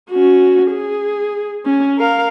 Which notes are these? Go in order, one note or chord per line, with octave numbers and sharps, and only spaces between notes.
C#4 F#4
G#4
C#4
A#4 F5